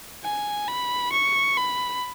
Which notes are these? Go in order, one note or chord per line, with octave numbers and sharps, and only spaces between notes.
G#5
B5
C#6
B5